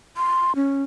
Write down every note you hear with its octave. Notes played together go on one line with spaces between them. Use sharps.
C6
C#4